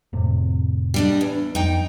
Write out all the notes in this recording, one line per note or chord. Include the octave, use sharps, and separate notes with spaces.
F1 A2 C3
G3 D4 D#5
E2
F2 D#4 G5